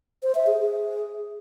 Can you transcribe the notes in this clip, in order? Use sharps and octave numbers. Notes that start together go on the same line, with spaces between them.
C5
E5
G#4
G#4